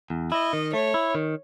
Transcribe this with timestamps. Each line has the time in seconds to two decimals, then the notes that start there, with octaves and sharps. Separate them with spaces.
0.10 E2
0.31 E4 D#5
0.53 D#3
0.73 A3 C#5
0.94 E4
1.15 D#3